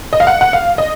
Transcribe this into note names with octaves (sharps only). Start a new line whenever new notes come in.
D#5
F5
F#5
F#5
F5
D#5